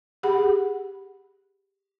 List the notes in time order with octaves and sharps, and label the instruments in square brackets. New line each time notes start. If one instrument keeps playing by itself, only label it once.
[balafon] G4 G#4 F#5 B5